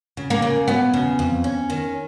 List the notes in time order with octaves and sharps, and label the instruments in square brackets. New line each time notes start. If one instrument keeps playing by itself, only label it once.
[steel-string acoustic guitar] C#3
[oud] A#3
[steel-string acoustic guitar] C#3
[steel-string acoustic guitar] F#3 [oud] B3
[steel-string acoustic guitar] C#3
F2
C#4
D#3